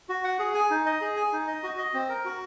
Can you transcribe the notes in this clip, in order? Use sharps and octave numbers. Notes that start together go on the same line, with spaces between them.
F#4
F#5
G#4
G#5
D#4
D#5
G#4
G#5
D#4
D#5
F#4
D#5
C4
A#4
F#4